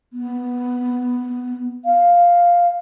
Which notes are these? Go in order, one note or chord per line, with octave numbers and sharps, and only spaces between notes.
B3
F5